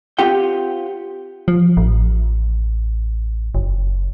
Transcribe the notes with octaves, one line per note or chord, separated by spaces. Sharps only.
C4 F4 G4 F#5 G5
F3
A1
F#1